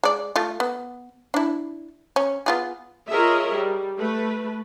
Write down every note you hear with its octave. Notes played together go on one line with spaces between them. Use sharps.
G#3 D5
A3 F4
B3
D4 E4
C#4
B3 F4 G#4
F4 G#4 A#4 C#5 D#5 E5
G3
A3 B4